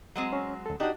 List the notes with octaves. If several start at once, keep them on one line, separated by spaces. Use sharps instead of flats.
F#3 G#3 C4
C#4
D2 A4
D4 D#4 F#4 G4 D#5